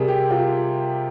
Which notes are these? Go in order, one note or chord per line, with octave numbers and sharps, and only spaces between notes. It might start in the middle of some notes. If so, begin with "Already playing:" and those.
Already playing: C3 G3 G#4 A#4
G4
F4